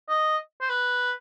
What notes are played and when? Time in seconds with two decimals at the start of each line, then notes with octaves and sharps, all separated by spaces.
0.09 D#5
0.61 C5
0.70 B4